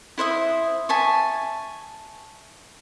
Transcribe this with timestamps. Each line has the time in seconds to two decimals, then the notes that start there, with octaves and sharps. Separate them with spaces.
0.18 E4 C5 E5 D#6
0.89 E5 G#5 A5 C#6